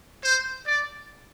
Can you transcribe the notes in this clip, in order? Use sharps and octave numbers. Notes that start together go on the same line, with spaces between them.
C5
D5